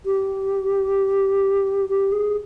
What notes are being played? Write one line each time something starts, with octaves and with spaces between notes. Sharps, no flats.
G4
G4
G#4